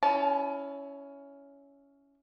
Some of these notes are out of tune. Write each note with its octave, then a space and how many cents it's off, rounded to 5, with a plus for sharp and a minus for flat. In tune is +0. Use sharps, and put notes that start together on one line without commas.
C#4 +15 E4 +0 A5 -35